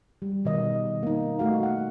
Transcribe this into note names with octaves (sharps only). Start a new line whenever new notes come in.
G3
B2 D#3 D#5
A#3 D#4
A3 F#4 F5
F#5